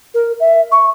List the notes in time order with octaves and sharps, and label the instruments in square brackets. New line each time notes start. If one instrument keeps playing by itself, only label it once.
[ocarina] A#4
E5
C#6